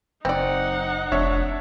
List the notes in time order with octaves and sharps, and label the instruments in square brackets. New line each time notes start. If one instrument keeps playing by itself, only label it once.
[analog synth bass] F#1 [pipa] C4 D5 [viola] D#4 F#5
[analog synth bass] F1 [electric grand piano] D4 C#5 E5